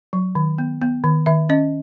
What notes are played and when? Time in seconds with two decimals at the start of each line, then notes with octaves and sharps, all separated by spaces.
0.13 F#3
0.35 D#3
0.58 B3
0.82 B3
1.04 D#3
1.26 D#3 E5
1.49 C#4 D#5